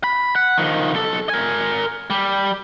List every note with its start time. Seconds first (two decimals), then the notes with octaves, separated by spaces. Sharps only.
0.04 B5
0.36 F#5
0.58 D#3 F3
0.94 B1 A4
1.29 A#4 G#5
2.10 G3